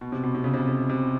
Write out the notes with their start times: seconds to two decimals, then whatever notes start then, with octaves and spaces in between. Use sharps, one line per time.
0.01 B2
0.12 C3
0.23 B2
0.35 C3
0.44 C#3
0.54 C3
0.68 C#3
0.89 C3